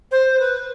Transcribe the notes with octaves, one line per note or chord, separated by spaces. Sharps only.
C5
B4